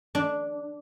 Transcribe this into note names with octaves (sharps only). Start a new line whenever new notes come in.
D4